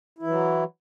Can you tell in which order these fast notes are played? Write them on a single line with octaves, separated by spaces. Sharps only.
E4 E3 F#3